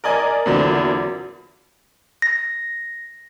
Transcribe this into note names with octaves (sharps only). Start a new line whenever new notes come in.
A#4 D5 D#5 G#5
E2 A#2 D3 F#3 C4
A#6